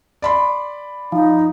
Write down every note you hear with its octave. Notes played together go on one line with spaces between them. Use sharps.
D5 B5 C6
F3 D#4